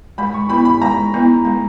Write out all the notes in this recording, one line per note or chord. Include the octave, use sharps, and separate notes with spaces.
G#3 B5
C#6
B3 E4 B5
B5
G#3 A#5
B3 E4
G#3